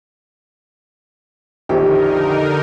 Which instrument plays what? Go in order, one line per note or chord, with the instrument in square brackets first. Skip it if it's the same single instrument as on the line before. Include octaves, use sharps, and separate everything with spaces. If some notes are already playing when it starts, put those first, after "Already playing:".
[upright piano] A#1 F2 D#3 [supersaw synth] D3 D#4 A#4 [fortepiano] G4